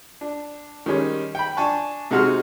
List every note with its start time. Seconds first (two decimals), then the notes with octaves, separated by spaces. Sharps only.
0.21 D4
0.86 D#3 G3 G#3 C#4
1.35 G5 B5
1.57 D4 G#5 A5 C#6
2.11 C3 G#3 D#4 F#4 F6